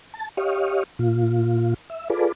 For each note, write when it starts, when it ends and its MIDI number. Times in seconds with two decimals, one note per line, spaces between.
0.14 0.29 81
0.37 0.83 67
0.37 0.83 73
0.37 0.83 75
0.37 0.83 77
0.99 1.74 46
0.99 1.74 65
1.90 2.08 76
2.10 2.32 65
2.10 2.32 68
2.10 2.32 69
2.10 2.32 71
2.10 2.32 74